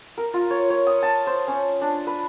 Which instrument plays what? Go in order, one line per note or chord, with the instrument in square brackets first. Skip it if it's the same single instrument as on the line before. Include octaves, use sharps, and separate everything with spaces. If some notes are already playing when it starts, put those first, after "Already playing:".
[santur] A#4
F4
C#5
C#5
D#6
A5
C5
C#4
D4
B4